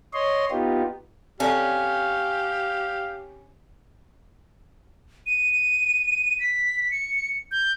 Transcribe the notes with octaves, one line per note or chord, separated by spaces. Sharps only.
C#5 D#5 C6
B3 D#4 F4 G4
C4 C#4 G4 A4 D5 F5
D#7
B6
C#7
G6